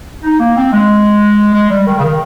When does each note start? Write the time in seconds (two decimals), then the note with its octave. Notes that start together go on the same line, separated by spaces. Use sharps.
0.24 D#4
0.40 A#3
0.57 C4
0.72 G#3
1.54 G#3
1.70 G3
1.86 D#3
1.99 C#3
2.03 D#3